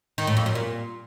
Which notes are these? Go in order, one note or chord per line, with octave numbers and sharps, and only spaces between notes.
D#3
A2
F2
F#2
A#2